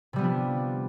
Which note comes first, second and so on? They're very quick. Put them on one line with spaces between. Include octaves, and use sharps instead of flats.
C3 G3 B3 F3 D4